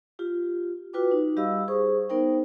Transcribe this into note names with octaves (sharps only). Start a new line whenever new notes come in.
F4 G4
F4 F#4 B4 G5 D6
D#4
G3 G4 D#5 F5 B5 E6
G#4 C5 C#6 D#6
B3 D#4 A#4 C5 G5